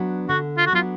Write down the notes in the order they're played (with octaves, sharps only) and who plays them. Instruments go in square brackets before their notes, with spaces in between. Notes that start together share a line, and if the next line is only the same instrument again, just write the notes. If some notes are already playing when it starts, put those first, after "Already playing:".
Already playing: [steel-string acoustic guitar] F#3 B3 D4
[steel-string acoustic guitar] D3 [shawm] F#4
[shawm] F4
F#4
[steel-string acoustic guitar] F#3 B3 D4 [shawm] F4